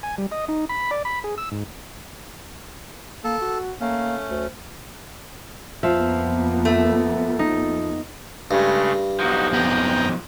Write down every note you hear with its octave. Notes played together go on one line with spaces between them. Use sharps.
G#5
G3
D#5
D#4
B5
D5
B5
G#4
E6
G#2
A#3 A4
F#4
A3 A#3 C#4
D2
F2 F3 A#3 B3 F4 E5
A3
D#4
G2 C#3 G#3 A3
B1 F3 D#4 F#4
F2 B3 G5 A#5 D#6